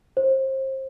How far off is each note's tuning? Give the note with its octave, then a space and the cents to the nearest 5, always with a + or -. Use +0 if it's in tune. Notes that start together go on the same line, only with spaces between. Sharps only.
C5 +30